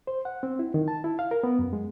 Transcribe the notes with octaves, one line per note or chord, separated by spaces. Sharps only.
C5
F#5
C4
E4
D#3
A5
E4
F5
A#4
B3
F#2
G#3